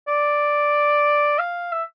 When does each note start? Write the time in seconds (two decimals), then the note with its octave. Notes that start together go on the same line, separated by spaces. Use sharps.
0.08 D5
1.39 F5
1.72 E5